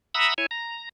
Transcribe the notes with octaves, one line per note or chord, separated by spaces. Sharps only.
E5 F#5 A#5 B5 D#6 E6
E4 C#5 G#5
A#5